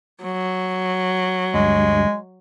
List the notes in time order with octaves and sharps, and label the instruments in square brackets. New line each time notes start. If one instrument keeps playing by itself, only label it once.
[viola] F#3
[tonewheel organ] D2 G2 [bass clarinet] G#3